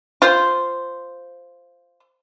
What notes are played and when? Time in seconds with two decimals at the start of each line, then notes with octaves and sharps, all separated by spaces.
0.22 F4 C5